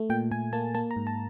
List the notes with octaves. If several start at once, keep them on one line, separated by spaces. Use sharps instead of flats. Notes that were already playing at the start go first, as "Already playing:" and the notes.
Already playing: A3
A#2 G5
A#2 G#5
A#3 A5
A#3 A5
A#5
G#2
A5